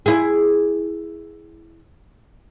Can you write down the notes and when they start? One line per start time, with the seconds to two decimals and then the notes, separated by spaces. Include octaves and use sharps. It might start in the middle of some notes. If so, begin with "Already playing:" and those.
0.06 E4 G#4